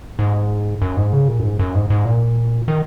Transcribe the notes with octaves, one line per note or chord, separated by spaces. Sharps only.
G#2
F#2
G#2
C#3
A#2
F#2
G#2
F#2
G#2
G#2
A#2
D#3